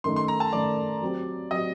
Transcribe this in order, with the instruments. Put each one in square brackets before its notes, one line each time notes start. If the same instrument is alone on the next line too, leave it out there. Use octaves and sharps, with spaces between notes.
[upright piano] F#2 D#3 A3 D#4 [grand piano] C6
[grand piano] C6
A#5
A5
[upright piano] F#2 D#3 A3 D#4 [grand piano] D5
[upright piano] F#3 C4 G4
[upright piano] F#3 C4 G4 [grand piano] D#5